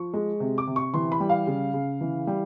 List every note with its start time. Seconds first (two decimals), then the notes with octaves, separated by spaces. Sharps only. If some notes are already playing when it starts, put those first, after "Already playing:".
Already playing: F3 C#6
0.14 G#3
0.40 C3
0.58 D6
0.67 C3
0.76 C#6
0.94 E3 C6
1.12 B5
1.20 G3
1.29 F5
1.47 C#3
1.73 C#3
2.01 E3
2.27 G3